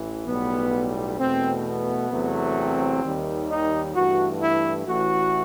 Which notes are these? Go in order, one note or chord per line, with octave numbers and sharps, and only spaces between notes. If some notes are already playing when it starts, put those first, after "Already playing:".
Already playing: A1 E3
B1 A2 G3 B3
E2 B2 A3 C4
B3
E2 C3 F#3 A3
C4
D#2 D#3 G3
D#4
G2 E3 A3 F#4
E4
A1 A2 E3 F#4